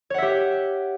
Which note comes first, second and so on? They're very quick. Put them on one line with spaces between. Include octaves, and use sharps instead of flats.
C#5 F#5 E5 G4